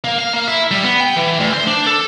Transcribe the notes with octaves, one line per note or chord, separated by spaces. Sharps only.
A#3
F5
A#3
E4
G3
B3
G5
E3
D2
C5
D4
A4